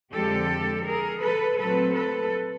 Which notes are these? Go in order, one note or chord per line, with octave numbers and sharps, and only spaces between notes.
F2 D3 F3 G#3 C4 G4 A4
G#4 A#4
A4 B4
A#2 F#3 A3 C4 A4 B4
A4 B4